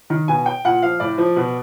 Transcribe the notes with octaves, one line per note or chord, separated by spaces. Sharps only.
D#3
B2 G#5
G5
A#2 F#5
F3 F5
A2 D5
F3
B2